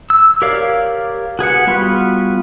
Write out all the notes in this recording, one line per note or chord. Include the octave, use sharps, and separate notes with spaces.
E6
G4 A#4 C#5 D5 F5
F#4 G#4 B4 F#5
G3 B3 F4 F#4 B4